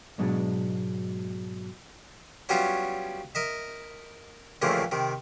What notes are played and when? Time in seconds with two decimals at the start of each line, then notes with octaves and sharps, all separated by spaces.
0.18 G#2 B2 F#3 G#3 D4
2.49 F#3 G3 B3 C#4 F4 E5
3.35 A#4 D#5 E5
4.62 D#2 A#2 C#3 E3 F3 A3
4.92 C3 D#3